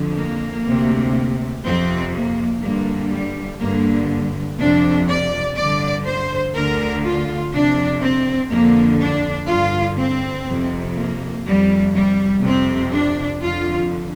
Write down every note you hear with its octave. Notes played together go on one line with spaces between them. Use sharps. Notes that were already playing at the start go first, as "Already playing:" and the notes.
Already playing: F2 D3
A#3
D2 C3
F2 C3 C4
A#3
G2 D3 A#3
G3
G2 D3 A#3
F2 C3 D4
D5
G2 D3 D5
C5
D2 D3 A#4
F4
F2 C3 D4
C4
F2 D3 A#3
D4
G2 D3 F4
C4
F2 C3
A#3
F2 C3 G3
G3
F2 C3 C4
D4
F2 D3 F4